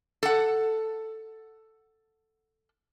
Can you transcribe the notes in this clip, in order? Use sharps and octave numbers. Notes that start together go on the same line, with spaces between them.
A4 F#5